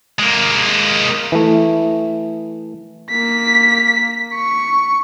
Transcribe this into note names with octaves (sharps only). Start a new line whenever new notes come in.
G#3 A#3
E3 A3
A#3 B6
C#6